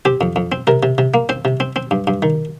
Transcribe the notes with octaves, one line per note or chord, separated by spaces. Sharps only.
C4 G4
F2
F2
C4
C3 A#4
C3
C3
A#3
C4 C5
C3
C4
C4
G2
G2
D#3